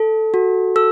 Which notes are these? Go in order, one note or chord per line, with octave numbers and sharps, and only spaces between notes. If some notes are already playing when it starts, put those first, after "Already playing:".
Already playing: A4
F#4
A4 E6